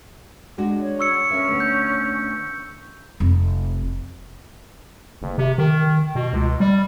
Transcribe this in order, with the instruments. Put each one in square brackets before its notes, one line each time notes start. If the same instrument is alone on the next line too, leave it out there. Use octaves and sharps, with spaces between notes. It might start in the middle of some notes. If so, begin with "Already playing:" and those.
[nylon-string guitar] G#3 D4 F#4
[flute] C#5
[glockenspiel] C#6 E6 C#7
[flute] C#4 [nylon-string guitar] A#4 E5
[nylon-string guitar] D2 B3
[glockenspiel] G6
[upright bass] F1
[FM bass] F#1
C3
D#3
B2
C#2
G3